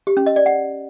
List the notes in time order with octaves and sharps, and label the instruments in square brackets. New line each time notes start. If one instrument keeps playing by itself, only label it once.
[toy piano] G4
C#4
D#5
D5
F#5